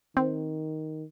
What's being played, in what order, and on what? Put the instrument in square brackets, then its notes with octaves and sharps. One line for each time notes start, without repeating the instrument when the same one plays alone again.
[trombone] D#3 [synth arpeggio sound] C4